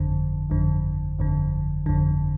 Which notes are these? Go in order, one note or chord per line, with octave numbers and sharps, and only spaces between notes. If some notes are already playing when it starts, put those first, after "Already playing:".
Already playing: G1 F2 D3
G1 F2 D3
G1 F2 D3
G1 F2 D3